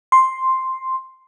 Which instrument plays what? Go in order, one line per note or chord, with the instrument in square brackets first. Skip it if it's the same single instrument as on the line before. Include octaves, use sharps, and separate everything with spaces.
[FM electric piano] C6